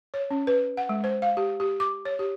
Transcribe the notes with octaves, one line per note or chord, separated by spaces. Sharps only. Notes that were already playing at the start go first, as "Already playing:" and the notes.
C#5
C#4
B4
F#5
G#3
C5
F5
G4
G4
D6
C#5
G4